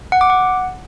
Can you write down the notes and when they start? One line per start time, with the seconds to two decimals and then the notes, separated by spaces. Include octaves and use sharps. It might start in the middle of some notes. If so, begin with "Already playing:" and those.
0.12 F#5
0.21 D6
0.30 F#5